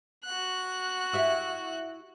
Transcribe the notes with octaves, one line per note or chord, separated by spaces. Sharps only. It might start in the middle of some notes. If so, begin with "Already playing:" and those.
F#4 F#6
E4 G4 E5